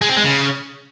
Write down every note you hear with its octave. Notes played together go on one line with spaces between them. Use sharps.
G#3
C4
G#3
C#3